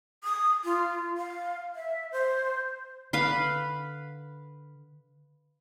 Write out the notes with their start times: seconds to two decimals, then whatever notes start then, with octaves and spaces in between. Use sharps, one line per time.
0.24 D#6
0.65 F4
1.18 F5
1.75 E5
2.12 C5
3.13 D3 B4 F5 B5